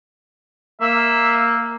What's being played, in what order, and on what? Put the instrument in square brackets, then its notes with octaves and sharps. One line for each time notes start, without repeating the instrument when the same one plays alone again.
[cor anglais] A#3 [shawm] E5